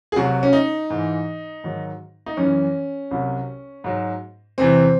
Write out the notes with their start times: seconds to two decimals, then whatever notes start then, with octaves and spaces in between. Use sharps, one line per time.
0.12 G#4
0.16 C2 C3 F#3 F#4
0.43 C#4
0.53 D#4
0.90 G#2 E3
1.64 G#2 D#3 F#3
2.26 D#4
2.37 F#2 E3 C#4
3.11 C2 C3 F#3
3.84 G#2 F#3
4.58 E2 C3 E3 C4